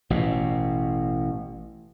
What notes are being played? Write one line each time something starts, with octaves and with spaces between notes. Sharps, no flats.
A1 B2